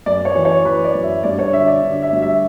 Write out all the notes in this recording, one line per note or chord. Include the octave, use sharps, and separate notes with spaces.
F#2 D5
C#5
E3
C#5
E3 B4
D5
F#2
E5
G2 D5
C#5
D3 E5
D5
D3
E5
G2
E5